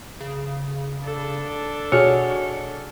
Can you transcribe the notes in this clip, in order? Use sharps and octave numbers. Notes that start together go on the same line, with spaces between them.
C#3
D4 A4
B2 F#4 G#4 C#5 F6